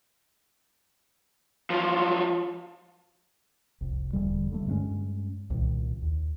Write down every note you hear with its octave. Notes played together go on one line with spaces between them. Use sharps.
F3 F#3
F1 C2
E1 D3 G3
D3 G3 A3
G2 G#3 A#3 C#4
C2 A#2 D#3
D#2